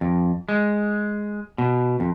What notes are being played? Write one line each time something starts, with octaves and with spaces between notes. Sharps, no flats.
F2
G#3
B2
F2